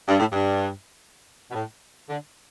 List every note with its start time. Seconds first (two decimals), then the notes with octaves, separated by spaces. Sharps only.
0.09 G2
0.20 A2
0.32 G2
1.50 B2
1.55 A2
2.09 D3